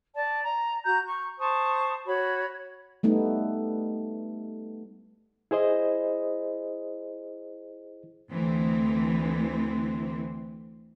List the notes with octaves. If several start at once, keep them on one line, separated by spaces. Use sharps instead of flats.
D5 A5
A#5
F#4 A#5 G6
C#6
C5 A5 C#6 D#6
F#4 C#5 B5
G3 A3 B3 D#4
E4 G#4 C5 D#5
D2 E3 C4